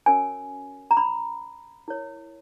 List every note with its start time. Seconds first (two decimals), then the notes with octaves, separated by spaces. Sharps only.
0.06 C#4 F#4 A#4 C#5 G#5
0.91 A#5
0.97 B5
1.88 E4 A#4 C#5